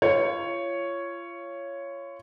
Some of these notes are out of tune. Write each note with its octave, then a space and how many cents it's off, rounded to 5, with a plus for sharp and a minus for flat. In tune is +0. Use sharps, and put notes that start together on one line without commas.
F4 -30 C#5 +0